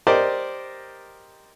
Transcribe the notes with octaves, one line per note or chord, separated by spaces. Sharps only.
G4 A#4 C5 D5 D#5